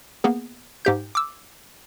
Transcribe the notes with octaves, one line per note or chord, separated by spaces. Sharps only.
A#3 B3 G#4
G#2 G4 G6
D6 E6